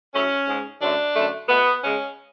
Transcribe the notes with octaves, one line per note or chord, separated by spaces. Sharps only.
A2 F#3 A3 C#4
G#2 G#3
F#2 D3 F#3 A3 D4
F#2 D3 A3
B2 A3 B3
C#3 G#3 C#4